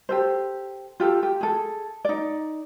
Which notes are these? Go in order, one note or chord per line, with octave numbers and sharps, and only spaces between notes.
G4 A4 C5
F4 G4 A4
G4
G#4 A4
D#4 D5